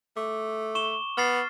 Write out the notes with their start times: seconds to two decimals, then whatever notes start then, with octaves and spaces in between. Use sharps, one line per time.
0.17 A3 D6
0.75 C#6 E7 G7
1.17 B3 F6 A6 C7